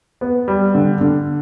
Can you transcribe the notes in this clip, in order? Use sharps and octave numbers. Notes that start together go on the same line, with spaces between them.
B3
G3
D3
D3